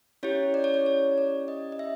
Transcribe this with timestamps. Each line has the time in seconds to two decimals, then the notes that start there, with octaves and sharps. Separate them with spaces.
0.23 C#4 E4 G4 C#5
0.54 D5
0.64 C#5
0.74 D5
0.86 C#5
1.18 D5
1.48 D#5
1.72 D#5
1.79 E5